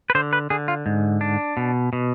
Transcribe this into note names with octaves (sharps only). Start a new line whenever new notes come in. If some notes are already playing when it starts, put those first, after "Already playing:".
B4
D3 C5
B4
D3 G#4
F4
G#2
D4
B2
B2